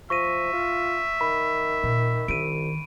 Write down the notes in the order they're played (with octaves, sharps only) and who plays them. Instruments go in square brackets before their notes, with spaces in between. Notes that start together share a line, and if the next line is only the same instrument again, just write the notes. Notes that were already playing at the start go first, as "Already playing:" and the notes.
[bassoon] F3 [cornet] E5 [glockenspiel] C#6 A#6 D#7
[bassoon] F4
[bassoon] D#3 [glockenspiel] B5
[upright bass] A#2
[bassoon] C2 [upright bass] D#3 [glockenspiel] D7 D#7